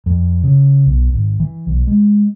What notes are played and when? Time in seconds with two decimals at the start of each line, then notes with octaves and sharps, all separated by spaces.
0.06 F2
0.43 C#3
0.86 B1
1.13 G#1
1.40 E3
1.67 B1
1.87 G#3